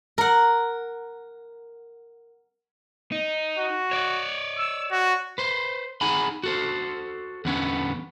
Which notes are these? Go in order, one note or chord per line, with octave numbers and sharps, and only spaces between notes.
A#4 F#5
D#4
F#4
C#5 D5
E6
F#4
B4 C5
D#4 G#4 F#5 G#5 B5
F#4 A4 C5
E2 D3 B3 C#4